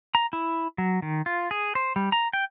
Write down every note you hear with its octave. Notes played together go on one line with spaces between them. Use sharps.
A#5
E4
F#3
D#3
F4
G#4
C5
G3
A#5
G5